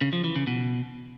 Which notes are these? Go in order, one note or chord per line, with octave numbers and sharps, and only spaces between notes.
C#3
F3
E3
C#3
B2